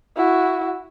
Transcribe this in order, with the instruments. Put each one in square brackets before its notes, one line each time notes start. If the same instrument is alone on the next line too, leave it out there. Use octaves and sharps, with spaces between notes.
[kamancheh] E4 F#4